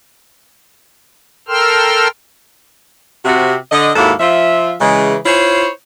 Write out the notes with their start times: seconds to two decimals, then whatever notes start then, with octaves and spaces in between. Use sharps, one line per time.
1.48 A4 A#4 G5 C6 E6 F6
3.25 C3 F#4
3.72 D3 D#5
3.96 D#2 G#2 A#3 E4 F#4 A4
4.20 F3 F4 E5
4.81 C#3 E3 G#3
5.25 E4 F4 C5 C#5